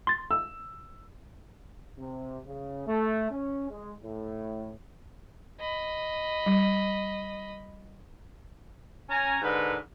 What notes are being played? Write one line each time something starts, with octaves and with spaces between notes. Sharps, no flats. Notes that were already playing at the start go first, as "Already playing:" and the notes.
C6 A6
E6
C3
C#3
A3
C#4
G#3
A2
D#5 B5
G3
C#4 G#5 A#5
G#2 D3 D#4 A#4 B4